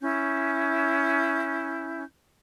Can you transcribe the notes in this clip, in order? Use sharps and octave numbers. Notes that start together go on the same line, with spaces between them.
C#4 E4 G6